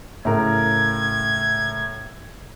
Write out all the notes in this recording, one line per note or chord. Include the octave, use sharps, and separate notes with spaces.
A2 C#3 A#4 G#6